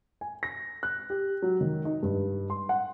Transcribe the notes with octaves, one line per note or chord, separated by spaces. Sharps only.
G#5
A#6
F#6
G4
F#3
D#3
D#4
G2
C6
F#5